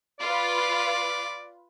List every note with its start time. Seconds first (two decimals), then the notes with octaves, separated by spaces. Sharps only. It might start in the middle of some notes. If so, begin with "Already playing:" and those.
0.20 F4 B4 D5